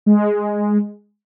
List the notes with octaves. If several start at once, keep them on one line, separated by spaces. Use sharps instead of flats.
G#3